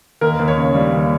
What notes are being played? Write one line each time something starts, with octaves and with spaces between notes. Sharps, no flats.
D#2 A#4
D#2
C#5
C#3
G3
D#2